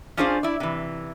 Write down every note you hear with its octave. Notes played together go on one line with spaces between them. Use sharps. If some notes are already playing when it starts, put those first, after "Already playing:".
C#4 D4 F4 G#4 C5 F5
E4 D5
C3 E3